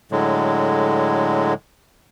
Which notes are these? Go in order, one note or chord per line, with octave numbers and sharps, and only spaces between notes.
A2 D3 F#3 G#3